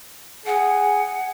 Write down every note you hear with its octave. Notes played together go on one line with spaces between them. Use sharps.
G#4 F#5